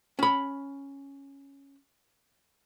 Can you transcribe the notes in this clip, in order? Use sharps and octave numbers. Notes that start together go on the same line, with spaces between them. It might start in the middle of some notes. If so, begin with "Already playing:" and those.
C#4 B5